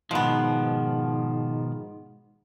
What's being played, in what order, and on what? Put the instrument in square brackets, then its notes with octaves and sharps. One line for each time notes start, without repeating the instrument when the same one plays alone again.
[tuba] G#2 [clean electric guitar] B2 D#3 F3 [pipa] G#3 B3